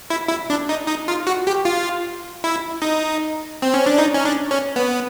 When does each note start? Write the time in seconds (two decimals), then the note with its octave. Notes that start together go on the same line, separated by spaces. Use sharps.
0.10 E4
0.29 E4
0.50 D4
0.69 D#4
0.88 D#4
1.08 F4
1.27 F#4
1.47 G4
1.65 F4
2.44 E4
2.82 D#4
3.62 C4
3.74 C#4
3.86 D4
3.98 D#4
4.14 C#4
4.25 D4
4.51 C#4
4.76 B3